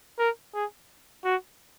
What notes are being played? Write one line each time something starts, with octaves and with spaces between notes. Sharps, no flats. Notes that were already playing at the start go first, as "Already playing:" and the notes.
A#4
G#4
F#4